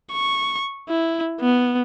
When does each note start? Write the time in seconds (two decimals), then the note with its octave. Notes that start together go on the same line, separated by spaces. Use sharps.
0.12 C#6
0.89 E4
1.41 B3